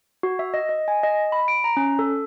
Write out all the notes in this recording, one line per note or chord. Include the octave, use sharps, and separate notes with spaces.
F#4
E5
D#5
D#5
G#5
D#5
B5
D7
A#5
C#4
A4